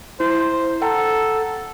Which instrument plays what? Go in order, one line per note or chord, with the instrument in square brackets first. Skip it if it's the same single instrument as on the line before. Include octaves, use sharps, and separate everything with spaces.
[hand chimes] E4 [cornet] C5
[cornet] A4 [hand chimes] F#5 G5 A#5